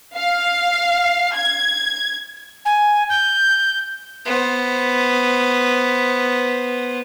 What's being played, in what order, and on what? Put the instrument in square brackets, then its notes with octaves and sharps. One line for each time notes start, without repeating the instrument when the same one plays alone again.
[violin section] F5
G#6
[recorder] G#5
G6
[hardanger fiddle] B3 C5